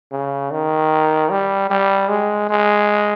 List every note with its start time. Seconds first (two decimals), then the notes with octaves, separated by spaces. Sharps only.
0.12 C#3
0.51 D#3
1.30 G3
1.70 G3
2.09 G#3
2.49 G#3